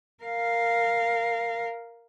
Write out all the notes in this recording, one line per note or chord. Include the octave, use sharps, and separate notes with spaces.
A#4 F5